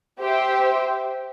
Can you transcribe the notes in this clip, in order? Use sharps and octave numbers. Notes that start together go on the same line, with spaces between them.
G4 C5 E5 G5